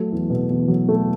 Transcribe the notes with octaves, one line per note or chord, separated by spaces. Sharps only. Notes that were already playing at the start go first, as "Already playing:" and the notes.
Already playing: F#3 A3
E2
B2
E2
F#3
A3